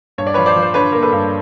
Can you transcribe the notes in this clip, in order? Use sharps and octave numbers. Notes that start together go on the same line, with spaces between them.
G2 C#5
D5
F3 B4 C#5
C5 D5
F3
C5
D3 B4 C#5
A#3 A#4
A4 B4
G2